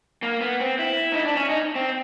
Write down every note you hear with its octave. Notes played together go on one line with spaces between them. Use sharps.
A#3
B3
C4
E4
D#4
D4
C#4
D#4
C4